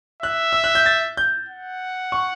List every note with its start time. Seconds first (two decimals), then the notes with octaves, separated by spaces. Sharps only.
0.22 E5 F#6
0.53 E6
0.64 F#6
0.75 G6
0.86 A6
1.17 G6
1.49 F#5
2.12 C#6